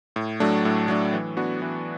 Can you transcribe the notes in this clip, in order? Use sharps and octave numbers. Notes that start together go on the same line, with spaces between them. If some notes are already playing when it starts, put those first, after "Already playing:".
A2
F#3 A3 D4
A2
F#3 A3 D4
E3
B3 D4 F#4
E3